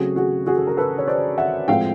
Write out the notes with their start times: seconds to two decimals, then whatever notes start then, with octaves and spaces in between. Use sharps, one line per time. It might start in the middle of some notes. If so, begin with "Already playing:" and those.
Already playing: C#3 F#3 A3 C4 F#4 G#4
0.16 F#4 G#4
0.47 F#4 G#4
0.57 A4
0.67 A#4
0.77 A4 B4
0.98 C#5
1.07 C5 D5
1.38 E5 F#5
1.68 A2 F3 G#3 C4 F5 G5